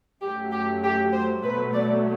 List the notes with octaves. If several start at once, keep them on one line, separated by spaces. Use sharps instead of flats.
F#2 F#3 A3 G4
G4
G4
C5
B2 F#3 A3 B4
D5